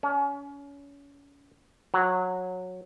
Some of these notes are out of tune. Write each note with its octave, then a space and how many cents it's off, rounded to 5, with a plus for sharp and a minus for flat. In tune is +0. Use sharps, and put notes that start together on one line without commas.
C#4 +30
F#3 -15